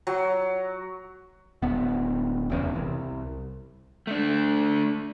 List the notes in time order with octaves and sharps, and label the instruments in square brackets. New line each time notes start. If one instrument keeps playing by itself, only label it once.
[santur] F#3
[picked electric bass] D1 B3
F1 E2 C#3
C2
[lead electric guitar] A3 D4